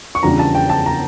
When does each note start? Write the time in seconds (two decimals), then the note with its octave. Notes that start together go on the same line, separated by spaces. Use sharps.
0.15 C#6
0.23 E2 C#3 G3 D4 F4 A#5
0.39 A5
0.55 G5
0.70 A5
0.86 A#5